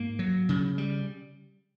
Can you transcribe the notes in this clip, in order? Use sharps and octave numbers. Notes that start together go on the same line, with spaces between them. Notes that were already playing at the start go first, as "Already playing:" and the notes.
Already playing: G#2 A#3
F#3
C#3
G3